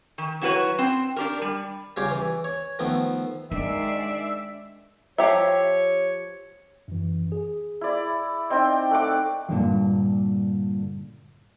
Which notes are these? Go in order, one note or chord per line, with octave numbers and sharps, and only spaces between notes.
D#3
F#3 E4 F#4 A4 B4 C#5
C4
D4 G4 A#4
G3
C#3 G3 F4 G4 C#5
E3
C#5
D#3 F3 A3 B3
D#3 G#3 D4 D5 E5
F3 G4 C#5 E5
F#2 E3
G#4
E4 D5
C4 D#4 D5 D#5 G5
A3 F#5 D6
G2 A#2 D3 E3 F3